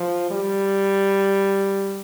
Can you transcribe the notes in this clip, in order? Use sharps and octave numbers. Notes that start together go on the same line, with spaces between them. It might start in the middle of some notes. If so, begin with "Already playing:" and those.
Already playing: F3
G3